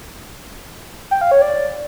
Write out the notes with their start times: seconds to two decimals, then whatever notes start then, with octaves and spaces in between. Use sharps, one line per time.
1.11 G5
1.21 F5
1.31 C#5
1.42 D5